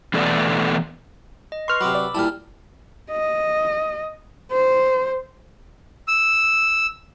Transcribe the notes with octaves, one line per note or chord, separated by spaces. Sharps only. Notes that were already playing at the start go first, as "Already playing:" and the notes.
B2 E3 A3 B3 A4 D5
D#5
B4 C6 C#6 F6
C3 F#3 B5 D6 E6
D5
A#2 G3 E4 A5 F6
D#5
C5
E6